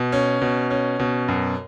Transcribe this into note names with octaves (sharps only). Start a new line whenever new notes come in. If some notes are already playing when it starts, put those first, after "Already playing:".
Already playing: B2
C#4
B2
C#4
B2
F#2